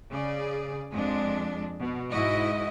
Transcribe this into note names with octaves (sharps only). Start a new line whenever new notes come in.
C#3 G#4 D5
F2 G#3 D4
B2
G#2 E4 F#4 D#5